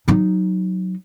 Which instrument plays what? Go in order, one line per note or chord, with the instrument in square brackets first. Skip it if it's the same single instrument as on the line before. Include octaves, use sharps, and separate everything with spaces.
[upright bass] F#3 D#4